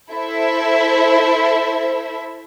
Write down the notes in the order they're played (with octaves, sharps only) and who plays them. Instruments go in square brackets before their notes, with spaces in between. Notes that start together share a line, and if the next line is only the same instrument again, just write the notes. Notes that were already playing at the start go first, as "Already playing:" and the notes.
[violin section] E4 A4 C5 E5